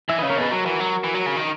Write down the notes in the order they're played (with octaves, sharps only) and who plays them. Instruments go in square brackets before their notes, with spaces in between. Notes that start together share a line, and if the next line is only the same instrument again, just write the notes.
[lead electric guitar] E3 [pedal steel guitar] E5
[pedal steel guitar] B4 D#5
[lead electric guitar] C#3
[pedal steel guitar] A#4 C#5
[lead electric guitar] B2 [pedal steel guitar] G#4 B4
[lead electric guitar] F#3 [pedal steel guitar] F#4 A#4
[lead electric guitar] E3
F#3
E3
F#3
C#3
D#3